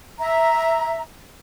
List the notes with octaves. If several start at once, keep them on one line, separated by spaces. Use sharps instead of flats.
E5 A#5